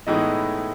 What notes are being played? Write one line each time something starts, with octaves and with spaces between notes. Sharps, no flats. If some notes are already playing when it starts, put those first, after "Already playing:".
A2 E3 G#3 B3 D#4 E4 D#5